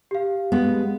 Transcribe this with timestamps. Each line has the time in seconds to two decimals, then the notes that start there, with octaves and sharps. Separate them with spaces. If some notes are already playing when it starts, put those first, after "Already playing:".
0.11 G4 F5
0.52 G#3 B3